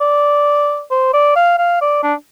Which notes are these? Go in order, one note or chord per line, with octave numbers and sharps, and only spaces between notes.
D5
C5
D5
F5
F5
D5
D4